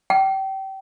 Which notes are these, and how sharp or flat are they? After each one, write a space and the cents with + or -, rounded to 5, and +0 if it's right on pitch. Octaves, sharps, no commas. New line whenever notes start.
G5 -30